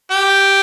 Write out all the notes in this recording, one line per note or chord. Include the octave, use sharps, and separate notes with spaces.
G4